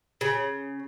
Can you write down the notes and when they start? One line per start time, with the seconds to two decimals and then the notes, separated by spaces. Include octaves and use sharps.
0.21 C#3